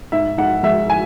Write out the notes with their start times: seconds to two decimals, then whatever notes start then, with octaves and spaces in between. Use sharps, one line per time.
0.12 G#2 E5
0.38 G#2 F#5
0.63 G#3 E5
0.90 G#5